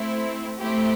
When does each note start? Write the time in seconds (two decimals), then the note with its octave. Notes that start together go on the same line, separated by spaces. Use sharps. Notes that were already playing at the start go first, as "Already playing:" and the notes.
Already playing: A3 C4 E4
0.59 A3 C4 E4 G4